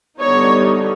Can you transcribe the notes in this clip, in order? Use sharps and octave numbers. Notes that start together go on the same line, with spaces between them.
D3 G3 B3 D#4 C#5